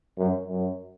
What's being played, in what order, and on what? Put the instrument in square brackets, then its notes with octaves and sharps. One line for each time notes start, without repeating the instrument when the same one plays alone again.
[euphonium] F#2
F#2